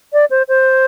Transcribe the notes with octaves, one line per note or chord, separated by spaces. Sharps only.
D5
C5
C5